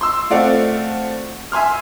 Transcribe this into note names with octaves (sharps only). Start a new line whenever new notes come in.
C6 E6
A3 C4 F4 D5 F#5
E5 G#5 C6 F6